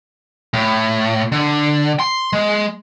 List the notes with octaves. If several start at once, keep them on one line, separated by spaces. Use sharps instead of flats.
A2
D3
C6
G#3